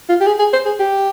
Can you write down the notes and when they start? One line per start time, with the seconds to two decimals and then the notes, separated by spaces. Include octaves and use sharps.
0.09 F4
0.20 G4
0.26 G#4
0.39 G#4
0.53 C5
0.65 G#4
0.79 G4